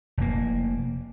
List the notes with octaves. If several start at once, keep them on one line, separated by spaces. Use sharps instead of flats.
F1 A#3